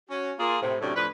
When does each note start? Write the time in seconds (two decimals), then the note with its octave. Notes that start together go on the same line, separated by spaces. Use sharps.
0.10 C#4 F#4
0.39 A#3 F4 G#4
0.61 A2 C3
0.81 A2 C3 F#3 A3 C#4 D4
0.96 A2 F3 D4 B4